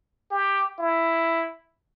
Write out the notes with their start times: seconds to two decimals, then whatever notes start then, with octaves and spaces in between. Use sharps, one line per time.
0.31 G4
0.79 E4